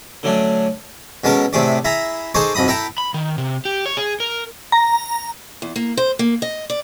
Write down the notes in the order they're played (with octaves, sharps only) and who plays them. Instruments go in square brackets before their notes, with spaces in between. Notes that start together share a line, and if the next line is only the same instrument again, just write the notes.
[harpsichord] D3 F#3 A3 C#4 D4
B2 G#3 C#4 A4 A#4
A2 C3 A3 G#4 D5
E4 G#4 E5 A#5
D#4 G#4 A4 C5 C#6 D6
B1 F2 D#5 B5 D#6
E4 A4 E5 G5 A#5
[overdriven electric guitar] B5
D#3
C3
G4
C#5
G#4
A#4
[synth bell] A#5
[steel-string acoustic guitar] E2
A#3
C5
A#3
D#5
D5